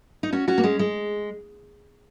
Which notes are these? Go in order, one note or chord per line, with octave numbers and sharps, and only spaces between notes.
D#4
C#4 F#4
C#4 F#4
A#3
G#3 C#4
G#3